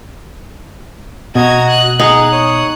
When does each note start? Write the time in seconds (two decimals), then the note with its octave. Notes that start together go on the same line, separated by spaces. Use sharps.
1.35 B2 F#4 D#5 A#5 G#6
1.68 F#6
2.00 D#4 G#4 F#5 F#6
2.32 C#5 D#6